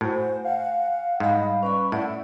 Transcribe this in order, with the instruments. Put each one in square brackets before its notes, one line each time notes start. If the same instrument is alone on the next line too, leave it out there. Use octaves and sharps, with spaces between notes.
[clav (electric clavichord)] A2 [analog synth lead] F#4 [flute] C5 [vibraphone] G#5
[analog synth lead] F5 [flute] F#5
[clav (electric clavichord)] G#2 [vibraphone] G3 B5 [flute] D#5
[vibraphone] C#4 D5 B5 [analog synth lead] B4 [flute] C#6
[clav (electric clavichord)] A2 [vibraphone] D5 [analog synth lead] E5 [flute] F#5